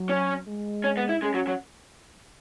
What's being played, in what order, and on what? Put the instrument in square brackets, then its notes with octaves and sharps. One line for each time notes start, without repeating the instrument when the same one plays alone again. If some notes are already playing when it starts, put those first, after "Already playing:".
Already playing: [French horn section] F#3
[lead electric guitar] C#4
[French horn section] G#3
[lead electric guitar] C#4
B3
E4
[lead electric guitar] G#3 [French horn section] C#4
[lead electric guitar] F#3
F#3